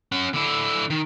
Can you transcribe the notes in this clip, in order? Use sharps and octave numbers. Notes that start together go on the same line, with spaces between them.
C#4 F#5
D3 E4
D#3